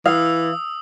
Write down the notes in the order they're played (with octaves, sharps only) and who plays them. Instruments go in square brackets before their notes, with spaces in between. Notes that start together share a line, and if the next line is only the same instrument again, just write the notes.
[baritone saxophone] E3 [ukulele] F5 [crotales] D#6 E6